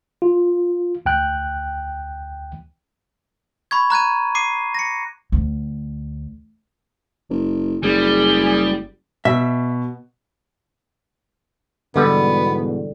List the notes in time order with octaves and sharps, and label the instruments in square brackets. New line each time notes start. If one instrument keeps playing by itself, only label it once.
[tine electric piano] F4
D2 G5 F#6
[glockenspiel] B5 C#6 G#6
A#5 F#6 G#6 D#7
D6 C7 D#7
A#6 C#7
[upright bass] D2
[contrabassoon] F#1
[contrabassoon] F#1 [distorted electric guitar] G3 [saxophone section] G#4
[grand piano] B2 [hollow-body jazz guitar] E5
[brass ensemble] E2 G#2 B2 [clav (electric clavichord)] D3 G3 [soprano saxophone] B3